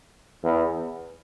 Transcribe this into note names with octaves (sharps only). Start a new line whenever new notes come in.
E2